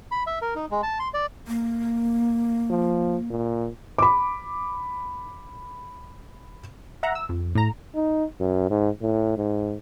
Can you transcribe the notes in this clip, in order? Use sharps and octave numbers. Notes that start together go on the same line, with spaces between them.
B5
E5
A#4
D#4
G#3
A5
C6
D5
A#3
F3
A#2
B5 D6
E5 F#5 A#5
E6
F2
A2 A#5
D#4
F#2
G#2
A2
G#2